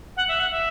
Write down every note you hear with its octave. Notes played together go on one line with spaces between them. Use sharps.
F#5
E5
F#5
E5